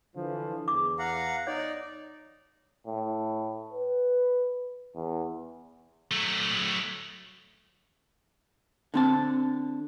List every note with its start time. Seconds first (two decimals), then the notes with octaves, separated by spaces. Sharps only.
0.16 D3 E3 F3
0.68 E2 D6
0.99 F5 F#5 A#5
1.47 D#4 C#5 D5
2.87 A2
3.73 B4
4.95 E2
6.11 F#3 A3
8.94 D3 C4 A5